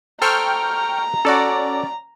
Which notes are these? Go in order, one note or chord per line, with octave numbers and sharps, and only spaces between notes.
A4 C5 G5 A#5 C#6 F6
C#4 F#4 A4 D5